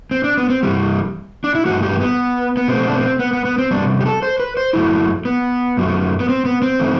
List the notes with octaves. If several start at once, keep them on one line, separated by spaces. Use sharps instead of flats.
C4
D4
B3
C4
G2 E3 G3
D4
E4
G2 E3 A3 F#4
G4
B3
B3
B2 A3 C4
D4
C4
B3
B3
B3
C4
E2 C3 G3 D4
G4
A4
C5
B4
C5
F#2 F#3 A3 E4
B3
F#2 F#3 A3
B3
C4
B3
C4
E3 A3